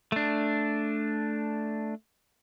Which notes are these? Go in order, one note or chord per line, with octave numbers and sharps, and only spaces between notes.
A3 D4